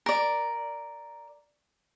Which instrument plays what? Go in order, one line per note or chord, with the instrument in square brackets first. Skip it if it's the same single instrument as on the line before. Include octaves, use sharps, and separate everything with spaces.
[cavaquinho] A#4 D5